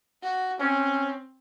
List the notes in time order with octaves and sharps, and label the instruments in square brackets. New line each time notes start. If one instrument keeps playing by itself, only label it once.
[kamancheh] F#4
[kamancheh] C4 [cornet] C#4